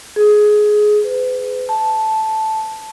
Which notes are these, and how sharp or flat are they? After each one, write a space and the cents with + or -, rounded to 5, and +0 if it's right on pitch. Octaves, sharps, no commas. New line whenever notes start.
G#4 +15
B4 +40
A5 -5